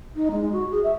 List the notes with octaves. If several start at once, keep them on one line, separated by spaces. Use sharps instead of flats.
D#4
G#3
F#4
G#4
E5